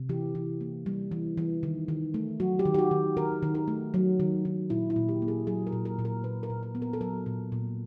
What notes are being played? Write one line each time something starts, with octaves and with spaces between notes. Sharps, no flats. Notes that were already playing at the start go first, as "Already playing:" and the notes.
Already playing: C3
E3 G4
E3
A#3
G3
E3
E3
D#3
D#3
A3
F#3 F#4
G4
D#3
G4
F#4
D#3
D#3 A#4
D#3
A#4
A3
F#3
D#3
D#3
A#2 E4
E4
A#2
G4
A#3
G#4
F#3 G#4
A#4
A#2
A#4
A#2
A#4
A#2 B4
A#4
A#2
A#4
B3
A#4
A4
F#3 A#4
A#2
A#2